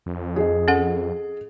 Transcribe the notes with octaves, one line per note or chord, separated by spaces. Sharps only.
F2
G#4 D#5
C#4 A4 F#5